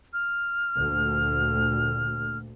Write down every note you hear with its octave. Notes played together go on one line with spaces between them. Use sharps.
F6
D2 A#2